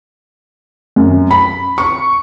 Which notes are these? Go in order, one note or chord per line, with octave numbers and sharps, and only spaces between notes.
F#2
B5
C#6